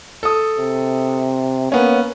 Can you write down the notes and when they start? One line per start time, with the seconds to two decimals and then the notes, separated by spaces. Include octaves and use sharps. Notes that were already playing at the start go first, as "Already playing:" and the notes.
0.23 A4 D#6
0.58 C3
1.72 A#3 B3 C#4